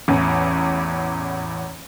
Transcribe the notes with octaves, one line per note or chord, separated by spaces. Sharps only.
A1 E2